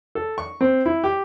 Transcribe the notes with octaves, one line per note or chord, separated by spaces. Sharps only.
A4
C#6
C4
E4
G4